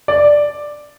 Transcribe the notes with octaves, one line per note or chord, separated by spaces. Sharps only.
D5